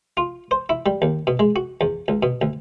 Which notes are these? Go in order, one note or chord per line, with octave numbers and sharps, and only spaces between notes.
F4
C5
E4
G3
D#2
B2
G#3
F#4
E2
C#2
B2
D2